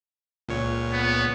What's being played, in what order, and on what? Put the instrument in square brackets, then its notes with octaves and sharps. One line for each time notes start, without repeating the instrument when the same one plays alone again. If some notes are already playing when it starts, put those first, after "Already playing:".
[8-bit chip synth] C#2 A#2 C#5
[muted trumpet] B3